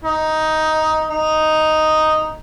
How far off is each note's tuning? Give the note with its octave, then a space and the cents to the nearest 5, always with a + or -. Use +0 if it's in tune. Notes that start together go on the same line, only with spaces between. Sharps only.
D#4 +10
D#4 +0